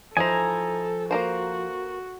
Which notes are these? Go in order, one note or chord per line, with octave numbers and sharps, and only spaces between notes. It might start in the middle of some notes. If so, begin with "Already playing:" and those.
F3 D#4 E4 A4 C5 G#5 A#5
A#3 F#4 A#4 C5